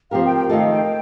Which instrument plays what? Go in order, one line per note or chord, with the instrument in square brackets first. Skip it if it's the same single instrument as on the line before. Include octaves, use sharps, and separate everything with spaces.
[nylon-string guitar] F3 C4 G4 A#4 [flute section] F5
[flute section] G5
G5
[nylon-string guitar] D#3 A3 D#4 A4 [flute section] F5
[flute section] G5